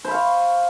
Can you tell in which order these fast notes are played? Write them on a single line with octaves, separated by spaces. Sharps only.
C5 B5 F5 C#6